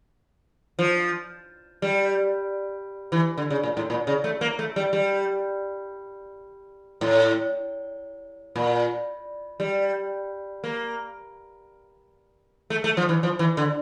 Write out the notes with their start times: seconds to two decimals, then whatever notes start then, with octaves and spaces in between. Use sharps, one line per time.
0.79 F3
1.82 G3
3.12 E3
3.38 D3
3.50 C#3
3.63 A#2
3.77 A2
3.90 A#2
4.07 C#3
4.24 A3
4.41 A#3
4.59 A3
4.76 G3
4.93 G3
7.01 A2
8.56 A#2
9.60 G3
10.64 A#3
12.70 A3
12.84 A3
12.97 F3
13.09 E3
13.23 F3
13.39 E3
13.57 D3